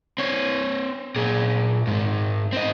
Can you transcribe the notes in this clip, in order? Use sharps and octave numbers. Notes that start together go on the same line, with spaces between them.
C4 C#5
A#2 G#4
G#2 D#3
C4 D#5